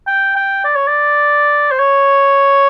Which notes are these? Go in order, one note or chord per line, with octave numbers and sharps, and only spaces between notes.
G5
G5
D5
C#5
D5
C5
C#5